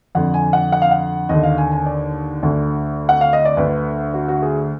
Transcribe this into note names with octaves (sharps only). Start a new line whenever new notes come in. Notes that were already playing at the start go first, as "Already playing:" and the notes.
F2 D3 F#5
G#5
F#5
F#5
F5
F#5
D#2 D3 D#5
F5
G#5
G#5
D5
D2 D3
F#5
F5
D#5
D5
D2 D3 B4
F#4
F#4
G#4